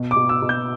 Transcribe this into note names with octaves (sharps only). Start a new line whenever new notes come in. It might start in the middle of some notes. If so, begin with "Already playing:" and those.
Already playing: B2
D6
B2
E6
B2
G6